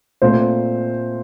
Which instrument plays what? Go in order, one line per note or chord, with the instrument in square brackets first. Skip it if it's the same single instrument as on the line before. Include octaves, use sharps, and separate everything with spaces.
[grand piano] A#2 A3 C4 C5